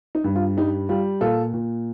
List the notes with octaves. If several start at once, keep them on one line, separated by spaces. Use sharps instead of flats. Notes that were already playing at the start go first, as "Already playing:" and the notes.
D#4
G2
F4
G3 D#4
G3 F4
A#2 F4 A4
A#2